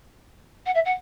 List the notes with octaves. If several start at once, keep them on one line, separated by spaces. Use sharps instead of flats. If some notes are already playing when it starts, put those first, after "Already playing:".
F#5
E5
F#5